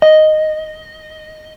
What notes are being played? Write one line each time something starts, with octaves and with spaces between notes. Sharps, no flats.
D#5